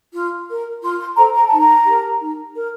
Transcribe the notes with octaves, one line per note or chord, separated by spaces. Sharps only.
F4
A#4
F4 C6
C6
A4 C5 A#5
A#5
D#4 A5
A#5
G4 A#4
D#4
A#4